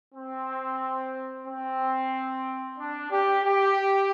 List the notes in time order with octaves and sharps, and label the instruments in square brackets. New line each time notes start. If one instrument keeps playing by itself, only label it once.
[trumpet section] C4
C4
D4
G4
G4